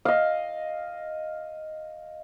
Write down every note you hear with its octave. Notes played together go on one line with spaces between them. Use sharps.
D#5 F5